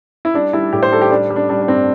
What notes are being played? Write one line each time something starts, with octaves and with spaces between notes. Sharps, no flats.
E4
G3 D4
G3 E4
A2 G4
C5
G3 A4
G4
G3 D4
G3
D4
G3 D4
D4
G2 C4